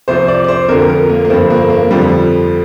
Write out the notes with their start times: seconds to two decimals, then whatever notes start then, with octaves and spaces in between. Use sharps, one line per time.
0.08 C2 C3 F3 C5
0.28 D5
0.44 D5
0.48 C5
0.69 F2 D3 F3 A#4
0.89 A#4
1.09 A#3
1.25 A#3
1.29 G2 D3 F3 C4
1.50 A#3
1.70 A#3
1.91 F2 D3 F3 G3